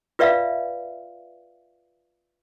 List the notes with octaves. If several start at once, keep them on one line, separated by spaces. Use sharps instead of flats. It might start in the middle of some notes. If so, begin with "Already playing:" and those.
F4 B4 D5 E5 F5